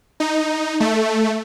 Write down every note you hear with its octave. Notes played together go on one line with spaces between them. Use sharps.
D#4
A3